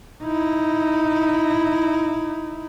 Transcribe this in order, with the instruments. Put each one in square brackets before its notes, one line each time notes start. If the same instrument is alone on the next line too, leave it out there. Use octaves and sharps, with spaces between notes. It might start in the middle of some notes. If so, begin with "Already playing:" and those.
[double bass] D#4 E4